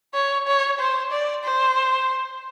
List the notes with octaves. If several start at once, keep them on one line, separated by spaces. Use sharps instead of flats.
C#5
C#5
C5
D5
C5